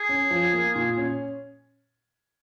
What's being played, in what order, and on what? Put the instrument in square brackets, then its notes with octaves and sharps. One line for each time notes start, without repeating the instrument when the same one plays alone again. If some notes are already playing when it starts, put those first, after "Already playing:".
Already playing: [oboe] G#4
[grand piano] C#4
F3
A#3
A#2
C#4